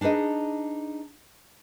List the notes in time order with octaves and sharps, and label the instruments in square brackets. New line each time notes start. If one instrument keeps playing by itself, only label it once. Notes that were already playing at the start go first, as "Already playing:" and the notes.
[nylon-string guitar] D4 D#4 G#4 B4 D#5